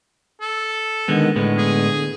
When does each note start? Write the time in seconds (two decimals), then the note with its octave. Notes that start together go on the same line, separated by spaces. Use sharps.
0.41 A4
1.08 D3 D#3 G#3 B3
1.36 A2 D3 G#3 B3
1.58 G#4